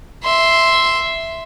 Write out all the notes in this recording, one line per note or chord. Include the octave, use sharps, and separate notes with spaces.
E5 C6